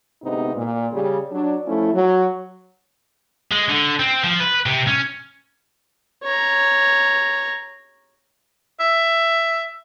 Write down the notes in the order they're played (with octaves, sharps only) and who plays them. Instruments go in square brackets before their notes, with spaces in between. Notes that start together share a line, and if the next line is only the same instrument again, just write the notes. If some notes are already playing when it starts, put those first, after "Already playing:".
[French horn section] D2 G#2 C3 B3 D#4
A#2
C#3 G3
F#3 D4
F3 A3 C#4 E4
F#3
[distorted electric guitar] G#3
D3
C4
F3
B4
C3
C#4
[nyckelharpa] C#5 A#5
[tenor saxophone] E5